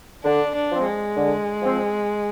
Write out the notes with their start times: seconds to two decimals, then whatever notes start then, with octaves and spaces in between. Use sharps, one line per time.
0.24 D3 D4
0.55 D4
0.71 F3 C4
0.85 G#3
1.16 D3
1.62 F3 C4